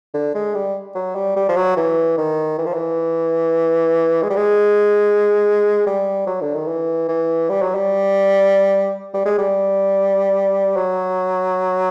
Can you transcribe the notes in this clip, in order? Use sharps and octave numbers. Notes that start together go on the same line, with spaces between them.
D3
G#3
G3
F#3
G3
G3
F3
F#3
E3
D#3
E3
F3
E3
G#3
G3
G#3
G3
F#3
D3
D#3
E3
E3
G3
F#3
G3
G3
G#3
G3
F#3